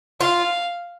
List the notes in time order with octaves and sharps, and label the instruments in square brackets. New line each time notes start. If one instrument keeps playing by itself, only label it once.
[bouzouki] F4 [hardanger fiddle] F5